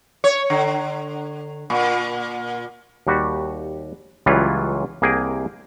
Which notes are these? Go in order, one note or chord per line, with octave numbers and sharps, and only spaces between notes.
C#5
D3
A#2
D#2 G3 F#4
C#2 E3 F#3 G3 F4
C2 A#3 G#4 G5